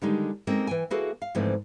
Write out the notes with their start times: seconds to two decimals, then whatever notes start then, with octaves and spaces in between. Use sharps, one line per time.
0.02 D3 D#3 G3 G#3 D#4
0.47 G#3 A#3 C4 C#4 D#4 A4
0.67 E3 G5 G#5
0.90 A#3 E4 F#4 G#4 A4 B4
1.22 F5
1.35 G#2 D3 E3 F3 A3 C4